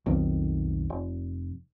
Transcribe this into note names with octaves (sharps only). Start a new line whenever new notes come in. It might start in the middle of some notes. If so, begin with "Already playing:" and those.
B1 F2 D#3
F1